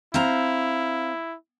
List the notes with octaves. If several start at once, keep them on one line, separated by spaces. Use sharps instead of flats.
C4 E4 F5 A#5